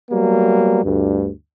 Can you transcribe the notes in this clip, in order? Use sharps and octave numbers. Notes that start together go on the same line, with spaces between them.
F#3 G3 A#3 B3
D2 G2